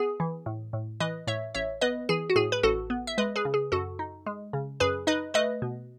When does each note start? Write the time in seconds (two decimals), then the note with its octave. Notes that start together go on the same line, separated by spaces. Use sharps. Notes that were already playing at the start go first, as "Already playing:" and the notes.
Already playing: B3 G#4
0.20 E3
0.46 A2
0.73 A2
1.00 E3 B4 D#5
1.27 A2 C#5 E5
1.55 A1 C#5 E5
1.81 B3 B4 D#5
2.09 E3 G#4
2.30 F#4
2.36 A2 G#4
2.52 B4
2.63 A1 F#4 A4
2.90 B3
3.07 E5
3.18 G#3 B4 D#5
3.36 G#4 B4
3.45 C#3
3.54 G#4
3.72 F#2 F#4 A4
3.99 D#4
4.26 G#3
4.53 C#3
4.80 F#2 G#4 B4
5.07 D#4 B4 D#5
5.34 A3 B4 D#5
5.62 B2